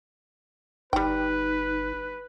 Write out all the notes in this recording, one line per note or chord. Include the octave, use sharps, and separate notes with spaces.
G1 G3 D#4 B4 G5